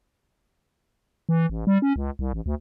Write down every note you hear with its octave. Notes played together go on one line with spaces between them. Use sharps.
E3
A1
G3
C#4
C#2
C2
A1
D2